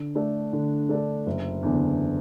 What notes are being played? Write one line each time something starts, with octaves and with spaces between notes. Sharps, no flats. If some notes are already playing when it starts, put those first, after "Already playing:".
Already playing: D3
A3 D4 A4
D3
A3 D4 A4
F#1
E2 D3